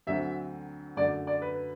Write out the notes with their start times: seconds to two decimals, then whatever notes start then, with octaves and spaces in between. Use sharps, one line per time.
0.07 D2 D3 F#3 A3 C4 E5
0.97 F#2 D3 A3 D5
1.27 D5
1.42 B4